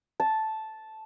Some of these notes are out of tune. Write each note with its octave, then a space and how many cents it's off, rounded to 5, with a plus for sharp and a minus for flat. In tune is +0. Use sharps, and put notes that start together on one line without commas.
A5 -5